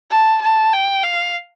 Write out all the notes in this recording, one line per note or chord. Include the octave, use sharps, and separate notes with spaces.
A5
A5
G5
F5